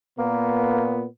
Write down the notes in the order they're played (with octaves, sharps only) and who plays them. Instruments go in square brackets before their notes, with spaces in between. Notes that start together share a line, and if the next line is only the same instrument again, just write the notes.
[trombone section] A#2 B3 [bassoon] A#3